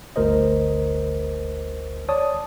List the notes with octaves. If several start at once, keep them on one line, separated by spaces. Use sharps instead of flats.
G1 D2 A#4 C5 D#5
C#5 D5 A5 D#6